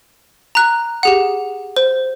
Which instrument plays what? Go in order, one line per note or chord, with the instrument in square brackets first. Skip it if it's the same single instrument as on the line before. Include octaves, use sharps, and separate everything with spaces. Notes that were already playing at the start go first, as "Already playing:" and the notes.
[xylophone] A#5 F#6
G4 G#4 F#5
C5